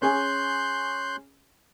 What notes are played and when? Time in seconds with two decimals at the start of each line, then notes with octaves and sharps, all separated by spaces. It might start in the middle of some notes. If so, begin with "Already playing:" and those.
0.02 C#4 G#4 G#5 C6 F#6 G6